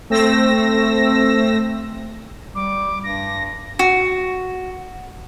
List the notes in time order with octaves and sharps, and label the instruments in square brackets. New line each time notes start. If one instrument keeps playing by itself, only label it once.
[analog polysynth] A3 C4 E6 A#6
[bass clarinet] G3 [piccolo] D6
[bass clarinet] G2 [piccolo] A#6
[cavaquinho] F#4